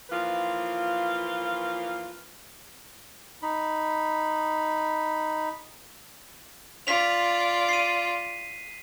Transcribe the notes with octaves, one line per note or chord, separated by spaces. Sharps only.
E3 F3 A#3 F4 B4
D#4 B5
F4 D5 B6 F7
C7 D#7